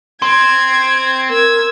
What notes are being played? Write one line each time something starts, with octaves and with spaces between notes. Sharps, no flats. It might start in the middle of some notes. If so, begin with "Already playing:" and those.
C4 C6 G#6
A#4 E6 G#6